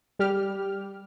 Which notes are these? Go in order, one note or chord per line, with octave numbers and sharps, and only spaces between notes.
G3 G4 F6